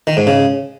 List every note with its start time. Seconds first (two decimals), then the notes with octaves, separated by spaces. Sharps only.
0.07 D#3
0.17 G#2
0.27 C#3